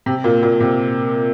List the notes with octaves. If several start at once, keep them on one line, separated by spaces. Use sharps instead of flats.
C3
A#2
A#2
C3